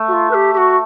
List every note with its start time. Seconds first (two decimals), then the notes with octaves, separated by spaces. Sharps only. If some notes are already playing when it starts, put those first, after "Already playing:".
Already playing: A3
0.08 F#4
0.13 F4
0.31 B4
0.34 G4
0.53 G4
0.57 F#4